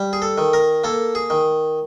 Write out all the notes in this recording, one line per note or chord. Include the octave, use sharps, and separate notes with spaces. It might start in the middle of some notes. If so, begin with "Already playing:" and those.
Already playing: G3
G#4
A4
D#3
A#4
A#3 A4
G#4
D#3